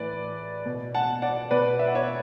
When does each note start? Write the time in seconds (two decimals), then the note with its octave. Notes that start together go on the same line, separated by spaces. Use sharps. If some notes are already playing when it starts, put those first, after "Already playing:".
Already playing: A2 E3 B4 D5
0.66 B2
0.94 F#5 A5
1.22 D5 F#5
1.51 B2 B4 D5
1.79 E5
1.87 F#5
1.95 C#5 E5